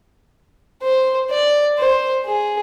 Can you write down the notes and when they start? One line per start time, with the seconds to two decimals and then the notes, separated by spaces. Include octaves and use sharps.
0.83 C5
1.30 D5
1.78 C5
2.26 G#4